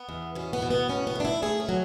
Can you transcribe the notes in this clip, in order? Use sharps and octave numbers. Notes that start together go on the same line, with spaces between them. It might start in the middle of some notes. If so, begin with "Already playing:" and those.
Already playing: B3
E2
B2 C#4
B3
B2
B3
A2 C#4
B3
A3 D4
E4
A3 G#4
C#4
F#3